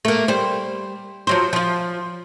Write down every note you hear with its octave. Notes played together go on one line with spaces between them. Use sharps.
A3 A#3
G3 C5
F3 F#3 C5
F3 F4